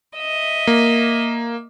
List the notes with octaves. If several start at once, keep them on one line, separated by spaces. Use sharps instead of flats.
D#5 E5
A#3